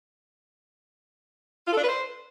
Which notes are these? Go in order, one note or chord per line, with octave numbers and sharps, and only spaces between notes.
F4
A4
D4
B4
C5